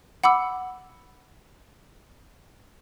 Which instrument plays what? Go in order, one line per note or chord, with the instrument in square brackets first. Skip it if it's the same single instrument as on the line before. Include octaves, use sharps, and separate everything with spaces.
[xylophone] F#5 B5 D6 E6